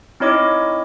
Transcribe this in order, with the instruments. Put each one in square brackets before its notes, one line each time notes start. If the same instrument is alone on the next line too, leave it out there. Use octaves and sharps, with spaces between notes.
[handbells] C4 D#4 E4 C#5 D#5 D6